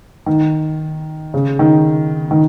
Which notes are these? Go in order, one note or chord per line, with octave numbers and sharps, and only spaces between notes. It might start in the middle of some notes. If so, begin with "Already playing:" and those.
D#3
C#3
D#3
D#3